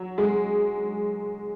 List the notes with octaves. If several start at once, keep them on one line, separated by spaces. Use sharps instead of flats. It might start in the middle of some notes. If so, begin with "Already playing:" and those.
Already playing: F#3
G#3